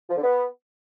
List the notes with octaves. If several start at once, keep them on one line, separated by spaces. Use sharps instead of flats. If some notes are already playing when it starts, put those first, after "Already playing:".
F3
D3
B3